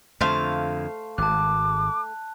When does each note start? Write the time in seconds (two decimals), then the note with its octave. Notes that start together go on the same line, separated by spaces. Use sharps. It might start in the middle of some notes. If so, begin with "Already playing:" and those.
0.21 F2 D3 A3 C5 F5
1.18 G#1 A5 D6 F#6